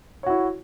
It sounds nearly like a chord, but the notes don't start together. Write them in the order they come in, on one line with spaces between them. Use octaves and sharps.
C#5 F#4 E4